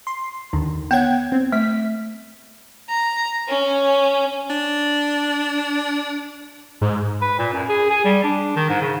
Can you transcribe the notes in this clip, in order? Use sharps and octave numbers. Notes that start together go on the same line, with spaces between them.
C6
D#2 D3 D#3
B3 C#5 F#5 G5 G#6
C4
A3 B6
A#5
C#4
D4
G#2
B4
A#2
F#2
G#4
G#4
G3
D4
D#3
G#2
C#3